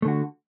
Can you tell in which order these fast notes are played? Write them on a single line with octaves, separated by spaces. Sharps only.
A3 D3 F#4